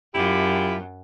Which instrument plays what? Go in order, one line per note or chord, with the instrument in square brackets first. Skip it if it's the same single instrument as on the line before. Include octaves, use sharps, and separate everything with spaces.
[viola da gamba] F#2 [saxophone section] E4 F4 G4